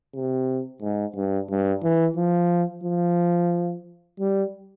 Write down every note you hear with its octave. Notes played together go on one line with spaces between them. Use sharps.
C3
G#2
G2
G2
E3
F3
F3
G3